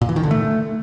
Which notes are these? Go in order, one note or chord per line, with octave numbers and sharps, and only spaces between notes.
A#2
E3
D#3
D3
A3